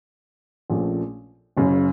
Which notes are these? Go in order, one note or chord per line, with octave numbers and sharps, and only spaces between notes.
A#1 A#2 F3 A3 C#4
F#1 F#2 C#3